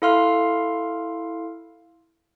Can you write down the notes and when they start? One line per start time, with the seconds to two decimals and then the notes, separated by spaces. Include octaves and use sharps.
0.02 E4 A4 F5 C6 F6